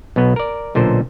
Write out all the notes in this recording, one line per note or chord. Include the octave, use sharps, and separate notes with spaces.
B1 B2 B3
A#4 D5
B1 A#2 D3 A4 C5